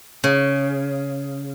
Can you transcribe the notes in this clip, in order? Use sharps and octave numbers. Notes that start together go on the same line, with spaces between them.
C#3